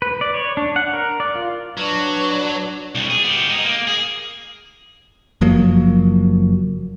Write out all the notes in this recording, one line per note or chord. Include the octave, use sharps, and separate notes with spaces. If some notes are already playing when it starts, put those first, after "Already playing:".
B4
D5
C#5
D4
F#5
A#4
D5
F4
F#3 D4 B4 D5 C#6
C2 G3
G#4
B3 G4
D#4 G#4
A#3
G#4
F#1 F3 F#3 A#3